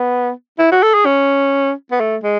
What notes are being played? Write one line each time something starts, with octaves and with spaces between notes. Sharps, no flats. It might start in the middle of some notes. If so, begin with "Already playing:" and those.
Already playing: B3
E4
F#4
A4
G#4
C#4
B3
A3
G#3